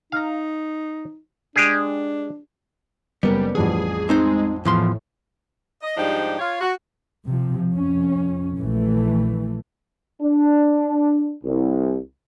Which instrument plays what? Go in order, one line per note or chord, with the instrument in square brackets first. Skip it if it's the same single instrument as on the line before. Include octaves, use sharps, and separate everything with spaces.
[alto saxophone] D#4 [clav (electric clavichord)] F5 A#5
[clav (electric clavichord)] G#3 G4 G#4 [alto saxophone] D4
[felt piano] F#1 A#4 [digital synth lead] G3 [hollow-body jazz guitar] B3
[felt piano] A1 F2 G3 [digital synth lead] G#4
[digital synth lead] G#3 [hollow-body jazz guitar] C4 D#4 C5
[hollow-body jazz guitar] E2 F3 C6 [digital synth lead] A2
[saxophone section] D#5
G#2 F3 G3 D4 D#4 G4
F4 C#5 F5
F#4
[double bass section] C3 F3
F2 C#4
A#1 E3 A3
[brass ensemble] D4
C2